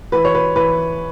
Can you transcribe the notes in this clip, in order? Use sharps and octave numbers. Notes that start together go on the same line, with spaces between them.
E3 B4
C#5
B4
E3 B4